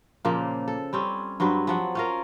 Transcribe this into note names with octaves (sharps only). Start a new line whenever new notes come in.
A#2 C#3 F3 A#3
A4
G3 C4 C#4
G2 F#3 C4 B4
F3 F#3 F#5
C#4 F4 A#4